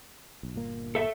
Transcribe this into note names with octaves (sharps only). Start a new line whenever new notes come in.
B1
G1 A#2 A#3
A4 E5